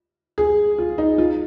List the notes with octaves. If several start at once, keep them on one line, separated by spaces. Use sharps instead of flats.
G#4
F4
D#4
F4